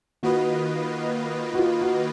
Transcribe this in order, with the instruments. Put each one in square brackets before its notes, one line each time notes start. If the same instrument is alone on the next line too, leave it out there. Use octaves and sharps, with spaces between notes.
[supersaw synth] D#3 A#3 F4 B4 D#5 [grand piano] F#4
[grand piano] F#4
F4
F#4